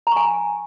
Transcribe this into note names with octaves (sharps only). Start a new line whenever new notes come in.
G#5 A#5 C#6